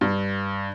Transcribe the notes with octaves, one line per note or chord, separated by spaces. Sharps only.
G2